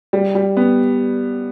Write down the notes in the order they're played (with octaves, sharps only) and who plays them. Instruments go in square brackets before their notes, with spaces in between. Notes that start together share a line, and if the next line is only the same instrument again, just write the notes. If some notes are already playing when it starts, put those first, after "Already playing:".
[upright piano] G3
G3
B3